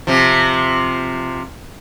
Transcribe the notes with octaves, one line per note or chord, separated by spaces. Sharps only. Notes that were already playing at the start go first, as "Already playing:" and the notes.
C3 F3